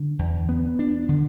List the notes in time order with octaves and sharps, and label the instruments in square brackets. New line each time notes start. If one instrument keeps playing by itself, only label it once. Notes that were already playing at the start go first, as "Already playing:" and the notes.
Already playing: [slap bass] D3
E2
B3
D4
D3